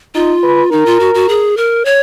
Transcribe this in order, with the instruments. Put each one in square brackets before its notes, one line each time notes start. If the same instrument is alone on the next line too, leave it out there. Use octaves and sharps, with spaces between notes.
[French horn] D#4 [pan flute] F4
[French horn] B4
[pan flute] D#4 [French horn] A#4
[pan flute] F4
F#4
F#4
G#4
A#4
C#5